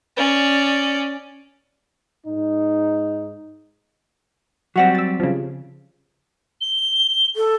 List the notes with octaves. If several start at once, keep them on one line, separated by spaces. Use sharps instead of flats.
C#4 D5
G#2 D#4
F#3 G3 C4 F#4 F#5 A#6
E6 A6
C#3 F3
G7
A4